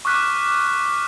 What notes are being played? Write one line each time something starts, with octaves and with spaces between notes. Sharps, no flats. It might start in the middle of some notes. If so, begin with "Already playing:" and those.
C#6 D6 F6 F#6 B6